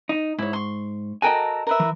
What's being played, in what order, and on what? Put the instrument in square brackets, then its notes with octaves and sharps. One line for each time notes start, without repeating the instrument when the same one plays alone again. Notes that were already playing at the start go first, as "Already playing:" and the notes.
[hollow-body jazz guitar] D#4
[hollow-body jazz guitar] G#2 [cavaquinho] E4 C#5
[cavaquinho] C6 C#6
[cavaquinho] F#4 A4 A#4 [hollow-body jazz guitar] D#5 G5 G#5
[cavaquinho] A#4 B4 E5
[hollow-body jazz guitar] E3